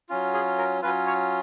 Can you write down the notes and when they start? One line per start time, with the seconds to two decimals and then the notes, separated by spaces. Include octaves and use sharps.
0.09 F#3 C#4 F4
0.34 G#4
0.58 A#4
0.82 F#3 C#4 F4 B4
1.07 C#5